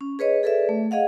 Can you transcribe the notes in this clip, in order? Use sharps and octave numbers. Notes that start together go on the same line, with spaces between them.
C#4
G#4 B4 C#5 D#5
G#4 A4 B4 D5 E5
A3
G#4 D#5 F5 F#5